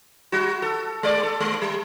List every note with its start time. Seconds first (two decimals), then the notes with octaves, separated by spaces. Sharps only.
0.32 G3 F#4
0.62 A4
1.03 G#3 D5
1.23 A4
1.40 G#3
1.62 G3